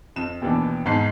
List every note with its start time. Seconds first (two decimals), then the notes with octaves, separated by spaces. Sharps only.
0.16 F2 E7
0.42 D#2 B2 E3 D4
0.85 E2 G#2 A5 C7